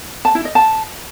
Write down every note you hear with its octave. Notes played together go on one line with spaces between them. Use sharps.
A5
E4
D#5
A5